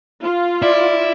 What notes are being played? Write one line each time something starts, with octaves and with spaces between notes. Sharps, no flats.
F4
E4 D5